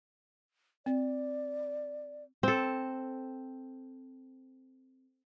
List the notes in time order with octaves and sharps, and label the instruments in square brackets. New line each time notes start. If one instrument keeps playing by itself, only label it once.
[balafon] C4 [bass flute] D5
[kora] C4 A4